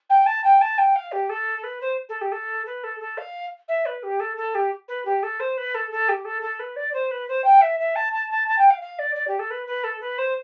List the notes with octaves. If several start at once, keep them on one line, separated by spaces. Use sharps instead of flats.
G5
A5
G5
A5
G5
F5
G4
A4
B4
C5
A4
G4
A4
B4
A4
A4
F5
E5
B4
G4
A4
A4
G4
B4
G4
A4
C5
B4
A4
A4
G4
A4
A4
B4
D5
C5
B4
C5
G5
E5
E5
A5
A5
A5
A5
G5
F5
F5
D5
D5
G4
A4
B4
B4
A4
B4
C5